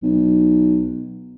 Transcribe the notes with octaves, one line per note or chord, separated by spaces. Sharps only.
B1